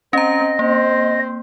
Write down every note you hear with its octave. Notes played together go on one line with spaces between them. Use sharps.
C4 C#4 D#5 A#5
A#3 C4 C5